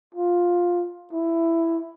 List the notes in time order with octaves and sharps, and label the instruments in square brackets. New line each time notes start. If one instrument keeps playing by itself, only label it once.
[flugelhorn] F4
E4